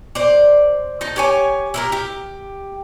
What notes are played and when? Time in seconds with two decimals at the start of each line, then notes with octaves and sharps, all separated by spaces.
0.15 C5 D5
1.01 D#4 A4
1.16 G4 C#5 G#5
1.74 E4 G4 A#4
1.92 G4